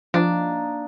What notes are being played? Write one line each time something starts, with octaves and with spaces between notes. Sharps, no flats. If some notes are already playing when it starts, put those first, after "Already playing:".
F3 A#3 D4 D#4